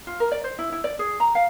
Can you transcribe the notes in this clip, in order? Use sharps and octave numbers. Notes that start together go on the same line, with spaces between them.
F4
A#4
D5
C5
E4
E4
D5
G#4
A#5
F5